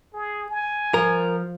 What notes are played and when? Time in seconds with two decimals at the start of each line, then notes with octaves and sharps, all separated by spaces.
0.14 G#4
0.50 G#5
0.94 F3 A#4